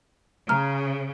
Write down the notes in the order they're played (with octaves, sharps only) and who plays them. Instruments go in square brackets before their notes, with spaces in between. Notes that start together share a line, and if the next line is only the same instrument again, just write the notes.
[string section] C#3 [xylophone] A#5 F6